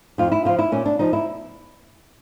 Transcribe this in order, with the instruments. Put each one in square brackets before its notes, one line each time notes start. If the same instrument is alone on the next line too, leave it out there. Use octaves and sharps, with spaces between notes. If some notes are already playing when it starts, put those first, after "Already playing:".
[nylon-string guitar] F2 F4
E4
D3 F3 F4
E4
A#2 C#4
D4
F3 D#4
E4